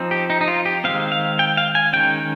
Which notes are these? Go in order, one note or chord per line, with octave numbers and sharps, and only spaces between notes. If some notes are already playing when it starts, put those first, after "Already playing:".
Already playing: F3 C4 D#4
G4
D#4
D#4
F4
G4
D#3 G#3 C4 F5
F5
G5
F5
G#5
D#3 G#3 C#4 G5